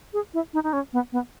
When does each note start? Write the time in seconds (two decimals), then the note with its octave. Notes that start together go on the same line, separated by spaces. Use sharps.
0.13 G#4
0.34 E4
0.54 D#4
0.64 D#4
0.73 C#4
0.93 B3
1.12 B3